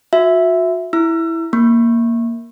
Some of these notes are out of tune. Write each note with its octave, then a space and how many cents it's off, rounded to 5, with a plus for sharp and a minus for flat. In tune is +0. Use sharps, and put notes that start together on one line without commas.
F#4 -35 E5 +0
E4 +0 E6 +35
A#3 +0 C#6 -25